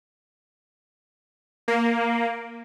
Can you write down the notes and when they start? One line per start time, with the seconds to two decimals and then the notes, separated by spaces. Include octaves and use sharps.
1.68 A#3